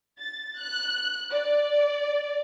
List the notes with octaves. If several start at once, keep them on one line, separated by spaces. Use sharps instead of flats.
A6
F#6
D5